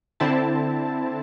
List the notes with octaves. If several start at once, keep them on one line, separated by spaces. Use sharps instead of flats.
D3 C4 E4 A5